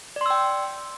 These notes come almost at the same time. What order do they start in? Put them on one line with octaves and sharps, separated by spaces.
D5 C6 E6 G5